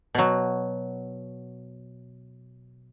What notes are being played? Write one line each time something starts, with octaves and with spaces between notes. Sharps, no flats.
B2 F#3